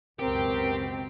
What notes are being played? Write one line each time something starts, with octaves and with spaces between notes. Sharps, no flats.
C#2 F#2 B2 C4 G4 A#4